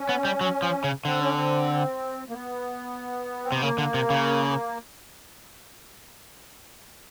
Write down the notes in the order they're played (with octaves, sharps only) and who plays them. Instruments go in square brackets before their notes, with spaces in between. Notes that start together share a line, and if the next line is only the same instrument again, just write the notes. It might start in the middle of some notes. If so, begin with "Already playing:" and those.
Already playing: [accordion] C#4
[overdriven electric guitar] B3
G3
F#3
F3
C#3
[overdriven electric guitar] D3 [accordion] C4
[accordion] C#4
C4
A#3
B3
C4
[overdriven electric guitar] C3 [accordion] B3
[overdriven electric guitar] C#3 [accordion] A#3
[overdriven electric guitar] D3
C3
C#3